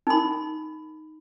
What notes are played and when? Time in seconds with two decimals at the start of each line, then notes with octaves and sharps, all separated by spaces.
0.07 D#4 B5